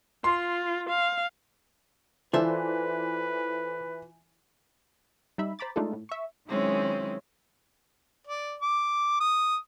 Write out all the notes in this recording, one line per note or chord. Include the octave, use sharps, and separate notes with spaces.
F4 C6
F5
E3 F4 A4 B4 C5 D5 E5
G3 D#4 E5 B5
C5 A#5 B5 D6 A6
G#3 A3 D4 D#4 F4 A4
A2
E5 C#6
D#3 F#3 G#3 C4 C#4 E4
D5
D6
D#6